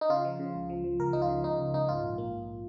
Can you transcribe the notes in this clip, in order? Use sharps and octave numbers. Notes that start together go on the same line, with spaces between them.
D#4
C#3 F4
F3
C#3
C#2
F3
F3
C#2 A#4
F3 D#4
F4
C#3
C#2 D#4
C#2
C#2 D#4
G#2 F4
A#1
A#3
A#1